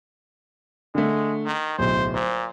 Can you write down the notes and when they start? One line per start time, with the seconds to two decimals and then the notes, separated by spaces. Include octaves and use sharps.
0.95 D3 G#3 A3
1.46 D#3
1.79 D1 B1 C5
2.14 A#2 C5